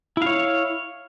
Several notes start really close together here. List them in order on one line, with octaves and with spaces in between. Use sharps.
E4 F5 C#5